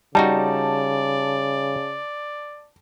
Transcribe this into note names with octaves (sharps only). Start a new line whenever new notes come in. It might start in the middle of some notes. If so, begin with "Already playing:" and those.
C#3 G3 D#4 F#4 D5 A5